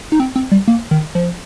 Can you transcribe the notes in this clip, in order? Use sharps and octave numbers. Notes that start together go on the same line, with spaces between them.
D#4
C4
C4
G3
A#3
D#3
F3